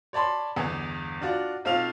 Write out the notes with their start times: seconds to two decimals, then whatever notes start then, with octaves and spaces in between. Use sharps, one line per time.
0.13 C#5 D5 A5 B5 C6
0.56 G1 E2 B3 G#5
1.21 D4 F4 F#4 D5
1.65 B1 C4 F4 F5 F7